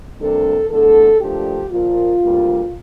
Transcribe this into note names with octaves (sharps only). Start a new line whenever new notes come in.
D2 C3 G3 A#3 D4 A4
E2 D3 A3 A4
A#2 F3 A3 D4 G4
A#2 F3 A#3 F4
D2 C3 G3 A#3